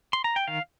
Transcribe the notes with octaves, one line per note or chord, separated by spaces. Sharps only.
C6
A#5
G5
D#3 F5